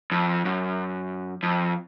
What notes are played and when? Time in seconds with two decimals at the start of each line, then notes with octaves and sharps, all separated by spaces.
0.12 F2
0.45 F#2
1.43 F2